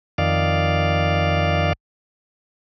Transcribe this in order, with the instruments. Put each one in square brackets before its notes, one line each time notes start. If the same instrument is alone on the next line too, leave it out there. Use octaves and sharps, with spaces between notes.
[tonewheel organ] F2 D#3 D5 F5